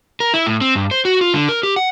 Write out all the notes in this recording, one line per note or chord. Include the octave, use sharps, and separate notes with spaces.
A#4
E4
A2
C4
G2
C5
F#4
F4
D3
A#4
G4
F#5